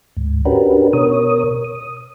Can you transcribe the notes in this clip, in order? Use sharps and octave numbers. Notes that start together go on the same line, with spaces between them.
D2 G#2
C#4 D4 F#4 G4 A#4 B4
B2 A#4 C#5 D#6
D#6